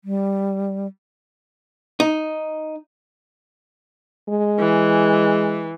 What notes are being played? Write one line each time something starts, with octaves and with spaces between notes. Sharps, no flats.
G3
D#4
G#3
E3